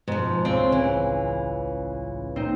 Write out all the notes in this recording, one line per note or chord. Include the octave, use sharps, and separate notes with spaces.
G#2 B2 F3
C#2 C4
A1 E3
A#2 C4 D#4